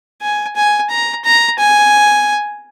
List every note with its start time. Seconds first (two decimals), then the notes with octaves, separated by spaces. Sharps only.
0.22 G#5
0.56 G#5
0.90 A#5
1.25 A#5
1.59 G#5